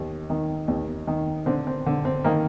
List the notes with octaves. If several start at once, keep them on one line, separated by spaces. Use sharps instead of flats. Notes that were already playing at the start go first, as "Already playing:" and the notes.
Already playing: D#2
D#3
D#2
D#3
D3 C4
C4
D3
C4
D#3 A#3